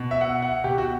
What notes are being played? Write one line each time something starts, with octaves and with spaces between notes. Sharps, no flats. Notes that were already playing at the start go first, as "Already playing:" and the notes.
Already playing: B2
E5
F#5
F#5
B2 G4
F#4